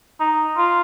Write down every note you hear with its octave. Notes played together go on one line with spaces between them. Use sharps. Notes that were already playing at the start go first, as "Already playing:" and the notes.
D#4
F4